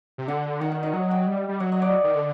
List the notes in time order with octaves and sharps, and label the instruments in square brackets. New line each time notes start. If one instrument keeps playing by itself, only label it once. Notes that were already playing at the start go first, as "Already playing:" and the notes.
[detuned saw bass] C3
[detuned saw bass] D3 [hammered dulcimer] F#5
[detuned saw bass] D#3 [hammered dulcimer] F#5
[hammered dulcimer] F#5
D#5
[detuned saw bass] F#3 [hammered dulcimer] F#5
[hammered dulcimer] G5
[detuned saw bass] G3
G3
[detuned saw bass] F#3 [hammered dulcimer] F#5
[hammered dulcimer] D#5
D5
[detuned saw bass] D#3
D3